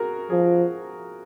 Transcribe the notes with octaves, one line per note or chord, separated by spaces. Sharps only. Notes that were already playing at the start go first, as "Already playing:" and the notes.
Already playing: F#4 G#4 A#4
F3 G#4